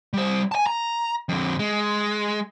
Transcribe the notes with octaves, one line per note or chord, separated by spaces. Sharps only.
G3 C5
G#5 A5
A#5
F2 D3
G#3